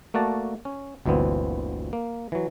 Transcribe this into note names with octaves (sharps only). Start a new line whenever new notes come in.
A3 A#3 F#4 D5 A5
C#4
G1 D2 A#2 E3 B3 C4
A#3
E3 F#3